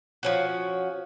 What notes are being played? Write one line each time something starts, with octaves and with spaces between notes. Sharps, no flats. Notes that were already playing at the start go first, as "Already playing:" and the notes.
F3 C#4 F#4